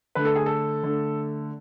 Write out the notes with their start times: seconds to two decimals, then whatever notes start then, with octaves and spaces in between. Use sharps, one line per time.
0.15 D3 A3 B4
0.25 A4
0.36 G#4
0.46 A4
0.83 D3 A3